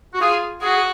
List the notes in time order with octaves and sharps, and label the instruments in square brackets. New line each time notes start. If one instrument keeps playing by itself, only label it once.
[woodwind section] F#4
[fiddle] F4 [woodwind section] G#4
[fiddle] F#4 [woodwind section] G#4
[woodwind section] G#4